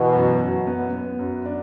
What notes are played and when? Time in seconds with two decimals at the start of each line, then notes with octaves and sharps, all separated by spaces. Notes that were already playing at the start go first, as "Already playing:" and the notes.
Already playing: B2 E3
0.15 F#2
0.41 F#2
0.67 B3
0.93 B3
1.19 F#2
1.45 D4